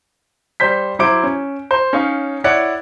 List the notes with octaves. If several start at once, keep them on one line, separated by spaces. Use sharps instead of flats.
G3 C5 G6 B6
F#3 E4 C5 D6 D7
C#4
C5
C#4 D#4 C#5 F5
E4 C#5 D5 F#5